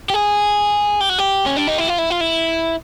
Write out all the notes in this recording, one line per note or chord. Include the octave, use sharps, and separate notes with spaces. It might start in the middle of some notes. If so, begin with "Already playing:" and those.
G4
G#4
G4
F#4
G4
C#4
D4
D#4
E4
F4
E4
F4
E4